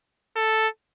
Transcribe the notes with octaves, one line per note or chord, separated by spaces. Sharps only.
A4